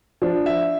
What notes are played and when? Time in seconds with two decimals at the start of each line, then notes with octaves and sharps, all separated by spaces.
0.22 F3 D4
0.46 E5